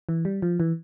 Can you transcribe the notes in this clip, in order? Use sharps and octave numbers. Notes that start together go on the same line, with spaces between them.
E3
G3
F3
E3